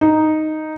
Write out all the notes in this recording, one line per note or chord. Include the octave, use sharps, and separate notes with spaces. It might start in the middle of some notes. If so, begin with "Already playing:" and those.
D#4